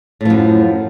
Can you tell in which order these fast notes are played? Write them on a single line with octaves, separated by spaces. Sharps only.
A2 F3 F#2